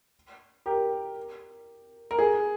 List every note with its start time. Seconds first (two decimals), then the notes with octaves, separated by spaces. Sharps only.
0.66 G4 A#4
2.11 A#4
2.19 G#4